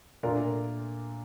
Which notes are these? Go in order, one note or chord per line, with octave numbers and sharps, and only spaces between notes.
A#2 A3 D4 F4 A#4